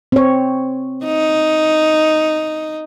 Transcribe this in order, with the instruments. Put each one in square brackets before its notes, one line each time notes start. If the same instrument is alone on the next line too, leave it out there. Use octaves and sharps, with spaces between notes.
[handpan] C4 C#5
[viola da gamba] D#4